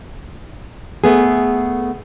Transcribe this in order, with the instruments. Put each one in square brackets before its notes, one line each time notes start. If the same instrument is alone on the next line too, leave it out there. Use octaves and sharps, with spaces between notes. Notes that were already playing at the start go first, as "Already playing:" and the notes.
[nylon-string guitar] A3 B3 G#4